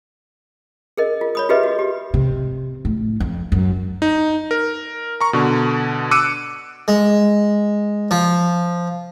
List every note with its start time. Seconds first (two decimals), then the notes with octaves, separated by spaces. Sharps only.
0.97 G#4 A#4 D#5
1.21 F4
1.35 C#5 B5 D#6
1.49 F4 G4 G#4 B4 D#5 E5
1.63 F#4
1.79 G4
2.14 C3
2.85 A2
3.20 F2
3.52 F#2
4.02 D#4
4.51 A#4
5.21 A#5 C#6
5.33 B2 D3
6.11 D6 E6 F#6 C#7 D#7
6.88 G#3
8.11 F3